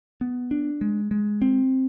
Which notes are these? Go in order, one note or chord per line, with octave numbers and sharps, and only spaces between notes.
B3
D4
G#3
G#3
C4